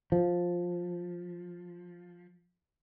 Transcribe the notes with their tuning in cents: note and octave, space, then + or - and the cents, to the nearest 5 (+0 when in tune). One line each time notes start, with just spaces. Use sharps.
F3 +10